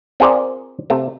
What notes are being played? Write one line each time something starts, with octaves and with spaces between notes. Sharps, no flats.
C4 F4 G#4 A#4 C5 D5
C3 A3